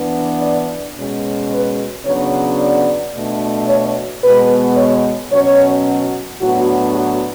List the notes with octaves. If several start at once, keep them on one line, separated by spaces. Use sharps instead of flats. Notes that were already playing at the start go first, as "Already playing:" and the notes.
Already playing: E3 B3 D4
D5
B2 G#3 C#4
B4
C#3 F#3 B3 D4 C#5
D5
B2 A3 D4
C#5
B2 G#3 B3 B4
C#5
B2 F#3 C#4 C#5
A2 F#3 B3 D4 F#4
F#4